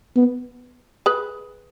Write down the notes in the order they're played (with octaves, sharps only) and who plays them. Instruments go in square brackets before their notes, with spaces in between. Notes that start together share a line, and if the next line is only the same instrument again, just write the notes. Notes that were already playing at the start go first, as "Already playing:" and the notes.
[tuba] B3
[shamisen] G#4 B4